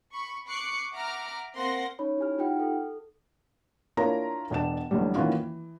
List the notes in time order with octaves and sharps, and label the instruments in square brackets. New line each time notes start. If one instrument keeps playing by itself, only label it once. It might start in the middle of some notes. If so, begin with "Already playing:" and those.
[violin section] B5 C#6
C#6 D6 F#6 C7 C#7
E5 F#5 A#5 D6 F6
A#3 C4 F#5 C6 A#6
[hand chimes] C#4 D#4 C#5 B5
E4 G4 G#5 F6
D#4 F4 G4 F#5 G5 F6
A4
[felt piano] D4 E4 F4 A#4 C#5 A#5
E1 B2 D4 A5 E7
A1 A2 D3 F#3 G3
D#3 E3 A#3 C#4 F4 F#4
E3